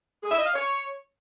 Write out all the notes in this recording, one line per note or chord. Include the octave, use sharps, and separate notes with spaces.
G#4
E5
D#5
F5
C#5